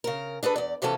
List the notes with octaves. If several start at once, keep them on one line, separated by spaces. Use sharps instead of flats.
C#3 A#4
D4 G#4 A4 B4
E2 D5
C3 E3 F3 B3 C#4 A4